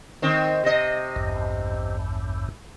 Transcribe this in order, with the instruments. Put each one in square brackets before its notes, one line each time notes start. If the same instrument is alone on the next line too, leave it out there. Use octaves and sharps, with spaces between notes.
[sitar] D#3 C4
C3 D#5
[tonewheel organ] A1 E2 G2